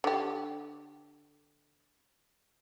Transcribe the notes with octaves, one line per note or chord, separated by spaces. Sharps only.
D3 G4